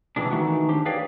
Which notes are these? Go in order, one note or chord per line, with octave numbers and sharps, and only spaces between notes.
C3 E3 G#3 D4
D#3 E3 A3 D#4 F#4
D4 G4 C5
G#4 B4 C#5 D5 F5 G5